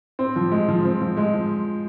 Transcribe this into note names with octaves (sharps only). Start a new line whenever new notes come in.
C4
F3
G#3
F3
C4
F3
G#3
F3